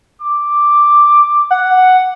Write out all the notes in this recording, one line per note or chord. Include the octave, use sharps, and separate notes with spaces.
D6
F#5